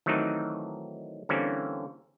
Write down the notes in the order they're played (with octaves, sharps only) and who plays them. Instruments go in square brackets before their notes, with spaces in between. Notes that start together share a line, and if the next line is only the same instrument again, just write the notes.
[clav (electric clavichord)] D#3 E3 F#3 A3 C4 D#4
D3 E3 G3 A#3 C4 C#4